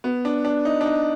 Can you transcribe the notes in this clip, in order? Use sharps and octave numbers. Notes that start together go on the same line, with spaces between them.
B3
D4
D4
D#4
D4
D#4